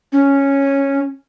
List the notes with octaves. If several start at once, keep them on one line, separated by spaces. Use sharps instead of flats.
C#4